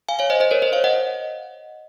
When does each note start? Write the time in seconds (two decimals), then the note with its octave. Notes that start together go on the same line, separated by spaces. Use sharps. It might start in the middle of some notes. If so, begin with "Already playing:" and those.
0.09 F5 G#5
0.19 C#5 F5
0.30 C5 D#5
0.40 C5 D#5
0.51 A#4 C#5
0.62 C5 D#5
0.73 C#5 F5
0.84 D#5 F#5